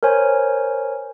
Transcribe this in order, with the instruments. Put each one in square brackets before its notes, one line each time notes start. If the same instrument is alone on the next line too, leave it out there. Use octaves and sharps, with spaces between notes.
[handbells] A#4 C5 C#5 G#5